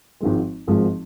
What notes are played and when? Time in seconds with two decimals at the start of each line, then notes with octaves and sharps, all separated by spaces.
0.20 G#1 G#2 F3 G#3
0.67 G#1 G#2 F3 G#3